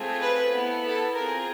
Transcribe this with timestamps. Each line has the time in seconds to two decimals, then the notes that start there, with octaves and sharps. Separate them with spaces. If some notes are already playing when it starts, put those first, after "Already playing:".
Already playing: A3 C4 F4 G#4
0.21 B4
0.52 B3 E4 A4
0.84 A4
1.15 C4 F4 G#4 A#4